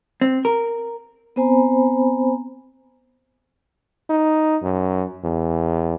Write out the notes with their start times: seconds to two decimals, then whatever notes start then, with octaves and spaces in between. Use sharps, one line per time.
0.21 C4
0.45 A#4
1.36 B3 C4 C5 G#5 A#5 B5
4.09 D#4
4.62 F#2
5.24 E2